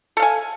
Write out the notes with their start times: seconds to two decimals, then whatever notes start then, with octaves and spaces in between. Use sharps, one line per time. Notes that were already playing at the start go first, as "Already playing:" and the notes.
0.17 A4
0.20 F5
0.22 G#5